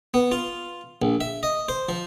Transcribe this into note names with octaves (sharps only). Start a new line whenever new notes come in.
B3
F4
A#1
E5
D#5
C5
F3